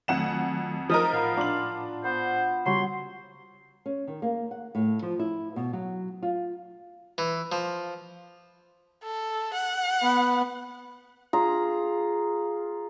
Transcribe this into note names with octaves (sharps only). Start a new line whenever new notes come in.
F2 D#3 F#3 A3 F#5 G#5 E7
F3 D#4 A#4 D#6 F6
A2 F5 F#5 B5
D4 F4 F#7
B3 C5
C#3 F#3 G3 C#5 C6
C#4
D#3
A#3
F#5
A2
F3
E4
B2
F#3
F4
E3
F3
A4
F#5
B3
F4 G#4 A#5